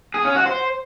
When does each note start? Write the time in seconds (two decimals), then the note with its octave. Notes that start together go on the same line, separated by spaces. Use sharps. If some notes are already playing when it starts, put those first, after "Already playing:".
0.14 G#4
0.25 C#4
0.35 F#4
0.46 C5